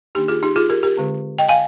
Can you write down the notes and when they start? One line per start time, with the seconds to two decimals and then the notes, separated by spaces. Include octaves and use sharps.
0.15 D#3 A#3 D4 D#4 G4
0.28 F4 G#4
0.43 D#4 G4
0.56 F4 G#4
0.70 G4 A#4
0.83 G4 A#4
0.97 D3 G#3 C4
1.39 D#5 G5
1.49 F5 G#5